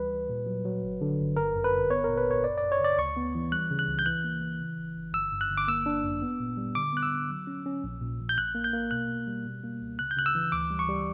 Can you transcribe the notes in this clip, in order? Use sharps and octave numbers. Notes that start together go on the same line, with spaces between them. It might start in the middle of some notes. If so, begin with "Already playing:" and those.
Already playing: D2 E3 G3 B4
G3
A#2
F#3
F#3
G1
D3
G1
G1 A#4
F#2
B4
G1
B3 C#5
A#2 A#4
B4
B1 C#5
F#2 D5
F#2 D5
C#5
C#3 D5
D2 C#6
B3
E3
G3 F#6
C#3
F#6
C#2
G6
E3 F#6
A#3
E3
C#3
G1
G1
G1 E6
G2
F#6
G1
D6
A#3 E6
D4
F#2
B3
A#2
G3
D3 D6
B3 F#6
E6
D3
F#3
C#4
C#4
A#1
A#2
A#1
G6
A#1 F#6
A#3
G6
A#3
B2 F#6
B2
G3
B2
A#3
C#2
C#3 F#6
G6
C#3 F#6
E6
E3
D2 D6
G3
C#6
G3